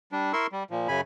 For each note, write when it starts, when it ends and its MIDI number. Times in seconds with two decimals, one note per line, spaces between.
0.12 0.32 55
0.12 0.32 62
0.33 0.47 64
0.33 0.47 70
0.33 0.47 84
0.33 0.47 85
0.33 0.47 88
0.52 0.63 55
0.71 0.88 46
0.71 0.88 53
0.88 1.01 42
0.88 1.01 49
0.88 1.01 80
0.88 1.01 83